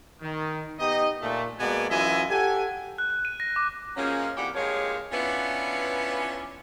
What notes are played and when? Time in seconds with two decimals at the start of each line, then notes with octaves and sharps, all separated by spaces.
0.22 D#3
0.79 B3 D#4 G4 D#5
1.22 A#2 A3
1.59 B2 G#3 A#3 B3 D5 G#5
1.90 F#2 E3 F4 D#5 E5 G#5
2.30 G4 A4 F#5 G#5
2.98 F#6
3.10 F#6
3.25 D#7
3.40 A#6
3.56 D6
3.96 F3 F#3 G#3 A#3 C#4
4.36 F2 E3 A#3 G4 D5 F#5
4.54 G2 F3 G#3 A#3 C#5
5.12 B3 C#4 D4 E4 F4 B4